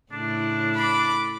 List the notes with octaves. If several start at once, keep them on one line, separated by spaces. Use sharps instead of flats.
A2 C#3 D4 E4
B5 D6